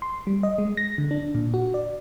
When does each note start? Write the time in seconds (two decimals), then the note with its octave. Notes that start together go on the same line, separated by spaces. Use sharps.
0.02 C6
0.27 G3
0.43 D#5
0.58 G#3
0.77 A#6
0.98 D3
1.11 D4
1.35 A#2
1.54 F#4
1.74 D5